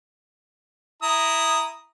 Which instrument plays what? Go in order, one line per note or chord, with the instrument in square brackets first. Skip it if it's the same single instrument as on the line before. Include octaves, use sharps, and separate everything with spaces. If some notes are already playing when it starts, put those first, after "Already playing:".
[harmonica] E4 A#5 D#6